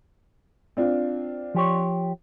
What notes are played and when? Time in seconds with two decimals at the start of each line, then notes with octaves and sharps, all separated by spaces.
0.77 C4 D4 F4
1.55 F3 G4 C#5